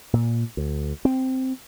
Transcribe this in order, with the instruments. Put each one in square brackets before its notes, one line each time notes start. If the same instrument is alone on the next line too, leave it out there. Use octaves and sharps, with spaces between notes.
[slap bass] A#2
D2
C4